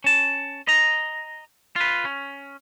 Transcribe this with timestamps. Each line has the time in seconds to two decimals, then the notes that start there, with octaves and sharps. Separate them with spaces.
0.04 C#4 A5
0.68 D#5 A#5
1.76 F4 B4
2.05 C#4